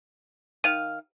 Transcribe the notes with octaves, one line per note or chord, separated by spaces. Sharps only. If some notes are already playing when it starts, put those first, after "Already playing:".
D#3 F5 D#7